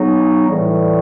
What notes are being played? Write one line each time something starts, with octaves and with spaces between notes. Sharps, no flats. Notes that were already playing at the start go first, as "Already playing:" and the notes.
Already playing: C#3 F#3 B3 D#4
A2 E3 G3